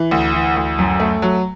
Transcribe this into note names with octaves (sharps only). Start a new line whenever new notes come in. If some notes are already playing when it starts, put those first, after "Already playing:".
Already playing: E3
D2
E3
D2
F#2
A3
F#3